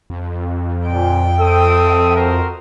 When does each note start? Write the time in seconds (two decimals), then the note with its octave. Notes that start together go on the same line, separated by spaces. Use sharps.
0.10 F2
0.87 A#2 G5
1.39 C4 A4 E5 D#6
2.15 F#4 A#4 C5